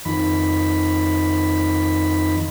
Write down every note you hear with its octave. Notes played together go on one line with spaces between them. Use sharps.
F2 D#3 B5